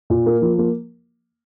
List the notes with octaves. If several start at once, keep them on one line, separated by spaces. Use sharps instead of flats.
A#2
A#3
F3
A#3